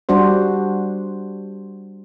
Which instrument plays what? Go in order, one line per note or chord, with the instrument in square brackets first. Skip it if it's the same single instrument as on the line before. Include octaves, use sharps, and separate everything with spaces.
[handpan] G3 D4 F#4 C5